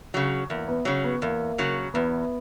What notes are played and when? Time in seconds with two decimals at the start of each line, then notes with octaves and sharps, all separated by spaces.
0.14 C#3 F#3
0.50 E2 A#3
0.68 B3
0.85 C#3 F#3 C#4
1.04 B3
1.22 E2 A#3
1.58 C#3 F#3
1.94 E2 B3